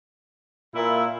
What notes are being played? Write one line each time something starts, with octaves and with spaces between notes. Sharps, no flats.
A#2 A#3 E4